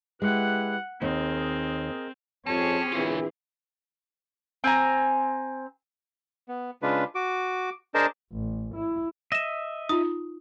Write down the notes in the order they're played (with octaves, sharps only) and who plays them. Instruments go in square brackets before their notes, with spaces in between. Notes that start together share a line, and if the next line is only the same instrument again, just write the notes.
[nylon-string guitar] G#3 [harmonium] E4 G4 B4 [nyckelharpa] F#5
[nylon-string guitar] D#2 D#4 [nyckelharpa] C4 [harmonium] G#4 A#4 D#5
[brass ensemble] F2 F3 C#5 [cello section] C4 G4 G#4 [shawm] C#4 [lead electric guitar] A5
[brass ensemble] A#1 E3 E4 [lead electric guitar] F4 C#5
[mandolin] C4 G#5 A#5
[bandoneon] B3
C#3 G#3 D4 F4 B4
F#4 D6
D4 G#4 A#4 C5 D#5 A5
[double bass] A1
E4
[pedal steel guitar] D#5 E5 [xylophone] A#6 E7
[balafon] D#4 F4 [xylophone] D#6